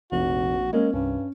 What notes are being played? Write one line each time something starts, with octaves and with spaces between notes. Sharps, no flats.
F1 A#1 F#4
G#3 A#3 C#4
C2 G2 C#4